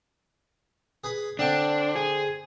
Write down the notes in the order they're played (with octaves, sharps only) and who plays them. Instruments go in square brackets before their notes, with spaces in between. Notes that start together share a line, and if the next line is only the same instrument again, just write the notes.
[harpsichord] G#4 B4
[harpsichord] D3 C4 A5 [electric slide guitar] D4
[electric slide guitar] G#4